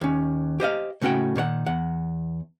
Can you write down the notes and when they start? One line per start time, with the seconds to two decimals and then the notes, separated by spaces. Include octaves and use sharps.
0.01 D#2 C#4
0.60 G4 C5 D#5 F5
1.01 A2 C#3 C#4 F#4 F#5 G5
1.36 A#2 D#3 C#5 F#5
1.66 E2 F#5